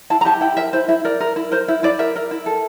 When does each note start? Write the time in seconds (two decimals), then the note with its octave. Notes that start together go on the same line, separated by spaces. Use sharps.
0.10 E4 A5
0.21 A#5
0.25 G4 A5
0.41 E4 G5
0.57 A#4 E5
0.73 E4 C5
0.88 E4 E5
1.05 A#4 D5
1.20 A#4
1.36 E4
1.52 A#4 C5
1.68 E4 E5
1.83 E4 D5
1.99 A#4 E5
2.16 A#4
2.31 E4
2.46 A4